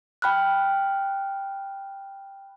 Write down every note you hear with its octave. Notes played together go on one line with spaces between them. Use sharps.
G5 B5 F6 F#6